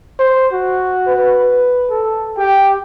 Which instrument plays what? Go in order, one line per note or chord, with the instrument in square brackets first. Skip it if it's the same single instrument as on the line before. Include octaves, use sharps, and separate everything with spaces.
[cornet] C5
F#4
[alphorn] B4
[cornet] A4
[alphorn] G4 [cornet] G5